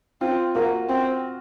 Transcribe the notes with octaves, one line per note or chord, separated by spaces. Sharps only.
C4 F4
A#3 F#4
C4